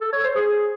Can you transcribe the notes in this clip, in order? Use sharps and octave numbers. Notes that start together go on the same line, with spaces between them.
A4
C#5
C5
G#4